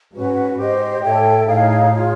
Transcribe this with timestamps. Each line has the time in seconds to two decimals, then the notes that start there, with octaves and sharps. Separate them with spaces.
0.13 G#2 C#4 F#4 B4
0.57 G#2 G4 C5 D#5
1.02 A2 A4 C#5 E5 G5
1.46 A2 D#4 G#4 C#5 F5
1.91 F4 G#4 C#5